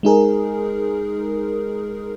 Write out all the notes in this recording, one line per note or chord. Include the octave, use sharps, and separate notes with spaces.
G#3 D#4 G#4 A#4